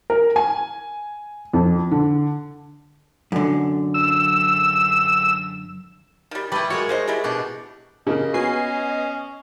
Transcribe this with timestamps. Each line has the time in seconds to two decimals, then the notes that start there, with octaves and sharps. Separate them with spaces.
0.10 A#4
0.36 G#5
1.53 F2
1.91 D3
3.32 F#2 D3
3.94 E6
6.31 D#3 G3
6.52 G3 A3 E4 B4
6.70 G#3 F#4 A#4 C#5
6.89 D#4 C5 D#5
7.08 G3 G#3 E4
7.24 B2 D4 D#4
8.07 C#3 A#3 D#5
8.34 B3 C#4 F#4 G#5 C7